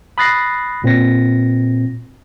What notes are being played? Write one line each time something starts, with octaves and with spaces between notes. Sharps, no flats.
B5 D#6 F#6 A6 A#6 C7
A#2 C4 A#6